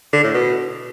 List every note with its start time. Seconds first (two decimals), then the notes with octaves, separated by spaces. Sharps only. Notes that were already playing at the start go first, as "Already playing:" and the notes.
0.13 D3
0.23 A2
0.34 B2